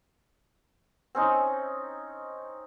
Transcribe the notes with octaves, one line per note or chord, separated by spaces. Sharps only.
C4 C#4 D#4